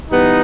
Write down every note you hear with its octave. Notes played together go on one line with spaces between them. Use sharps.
E3 G3 B3 D#4